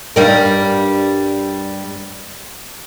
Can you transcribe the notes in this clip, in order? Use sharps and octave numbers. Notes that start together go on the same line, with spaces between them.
G2 G3 A#4